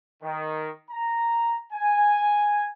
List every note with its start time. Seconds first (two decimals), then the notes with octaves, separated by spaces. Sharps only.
0.23 D#3
0.91 A#5
1.73 G#5